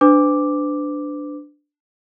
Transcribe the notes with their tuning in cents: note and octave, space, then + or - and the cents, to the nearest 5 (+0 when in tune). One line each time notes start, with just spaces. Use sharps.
D4 +0 B4 +40 D6 +0